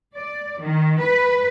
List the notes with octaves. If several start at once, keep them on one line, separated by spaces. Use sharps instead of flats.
D5
D#3
B4